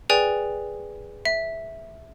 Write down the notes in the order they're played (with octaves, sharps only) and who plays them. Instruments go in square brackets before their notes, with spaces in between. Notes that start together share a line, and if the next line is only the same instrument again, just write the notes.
[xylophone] G#4 B4 D5 G5 G#5
E5